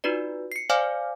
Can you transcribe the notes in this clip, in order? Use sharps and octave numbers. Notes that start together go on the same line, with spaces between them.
D#4 F4 F#4 B4 D5
C7 C#7
C5 D5 F5 G#5 D6 F6